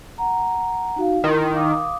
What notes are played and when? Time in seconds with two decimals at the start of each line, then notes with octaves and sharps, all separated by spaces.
0.18 F#5 A#5
0.96 D#4 F#4 F5
1.24 D#3 E4 C6
1.54 F5 D6 D#6